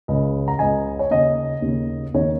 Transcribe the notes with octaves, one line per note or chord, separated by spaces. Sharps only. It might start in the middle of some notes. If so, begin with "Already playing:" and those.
C#2 C#3 D#5
A#5
C#2 C#3 D#5 G#5
C#5
D#2 C#3 D#5
D#2 C#3
D#2 D#3 C#5